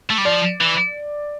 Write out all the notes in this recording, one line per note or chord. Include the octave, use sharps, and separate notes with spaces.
A3
G3
F3 D5
E3